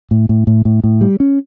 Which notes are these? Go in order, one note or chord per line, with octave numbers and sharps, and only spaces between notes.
A2
A2
A2
A2
A2
G3
C#4